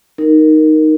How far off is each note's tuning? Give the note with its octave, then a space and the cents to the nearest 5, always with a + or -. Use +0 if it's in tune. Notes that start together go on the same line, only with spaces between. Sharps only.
D#4 +0 A#4 +0